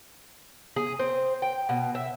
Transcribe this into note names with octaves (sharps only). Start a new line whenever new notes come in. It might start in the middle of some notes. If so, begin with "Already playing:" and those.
G#4
C4
G5
B2
E5